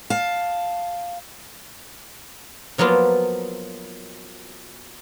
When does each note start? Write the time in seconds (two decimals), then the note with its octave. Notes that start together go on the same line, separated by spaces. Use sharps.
0.10 F5 A5
2.78 F3 F#3 A#3 B3 F4